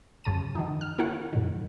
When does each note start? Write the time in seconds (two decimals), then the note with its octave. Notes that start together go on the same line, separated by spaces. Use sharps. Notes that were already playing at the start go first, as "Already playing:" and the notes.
0.24 F#2 C#3 A5 D#7
0.55 D#3 E3 D#4
0.81 F6
0.98 A#3 E4 C#5 F#5
1.33 F#2 A#2 D#3